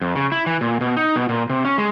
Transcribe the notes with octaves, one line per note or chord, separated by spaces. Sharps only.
F2
C#3
E4
E3
A#2
B2
D#4
B2
A#2
C3
C#4
G#3